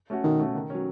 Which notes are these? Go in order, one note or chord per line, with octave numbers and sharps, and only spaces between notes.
A3 C#4 F#4
B2 D#3
A3 C#4 F#4
D#3
F#3 C#4